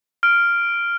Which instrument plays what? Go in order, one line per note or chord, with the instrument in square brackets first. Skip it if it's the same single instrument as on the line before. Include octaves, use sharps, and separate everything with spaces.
[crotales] F6 D7